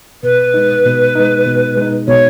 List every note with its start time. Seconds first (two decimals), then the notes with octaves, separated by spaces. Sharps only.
0.23 B2 B4
0.54 G#3 D#4
0.85 B2
1.15 G#3 D#4
1.47 B2
1.77 G#3 D#4
2.07 B2 C#5